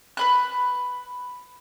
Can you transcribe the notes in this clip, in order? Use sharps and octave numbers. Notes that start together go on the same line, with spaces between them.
B4 B5 F#6